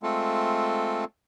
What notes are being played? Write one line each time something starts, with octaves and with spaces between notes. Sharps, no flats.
G#3 A3 C4 F4 A4